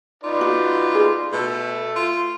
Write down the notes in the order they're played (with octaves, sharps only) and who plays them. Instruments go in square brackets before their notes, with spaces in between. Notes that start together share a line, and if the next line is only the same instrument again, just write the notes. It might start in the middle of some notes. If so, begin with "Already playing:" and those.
[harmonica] D#4 B4 D5 [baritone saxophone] F4
[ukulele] F#4
G#4
[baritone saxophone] B2 [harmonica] A3 A4
[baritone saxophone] F4